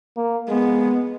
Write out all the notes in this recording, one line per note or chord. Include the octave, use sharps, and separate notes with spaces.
A#3
G#3 B3